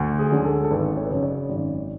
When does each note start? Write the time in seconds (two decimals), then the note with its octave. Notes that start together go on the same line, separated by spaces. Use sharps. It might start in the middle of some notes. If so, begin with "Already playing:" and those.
Already playing: D2
0.19 G#4
0.32 D3 G#3 C#4
0.45 A4
0.64 A4
0.70 G#1 B4
0.97 C#5
1.04 B4
1.10 F#2 C#3 C#5
1.23 D5
1.49 G#1